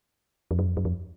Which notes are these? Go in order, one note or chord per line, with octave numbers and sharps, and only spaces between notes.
F2
F#2
F2
F#2
F2